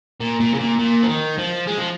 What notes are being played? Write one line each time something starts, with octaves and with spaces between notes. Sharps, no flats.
A#2
A#2
C#3
A#2
A#2
F3
D#3
F3
G#3
F3